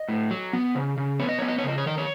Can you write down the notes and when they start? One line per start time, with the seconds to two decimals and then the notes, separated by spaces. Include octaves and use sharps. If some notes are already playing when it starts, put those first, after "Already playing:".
Already playing: D#5
0.08 A2
0.31 F#3
0.53 B3
0.75 C#3
0.97 C#3
1.20 B3 C#5
1.29 D#5
1.39 B3 C#5
1.48 D#5
1.58 C#5
1.64 C#3 D#5
1.78 C#5
1.86 D#3 D#5
1.98 C#5